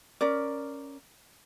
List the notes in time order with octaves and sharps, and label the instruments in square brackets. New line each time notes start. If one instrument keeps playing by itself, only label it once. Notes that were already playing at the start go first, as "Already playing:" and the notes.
[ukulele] C#4 A#4 D5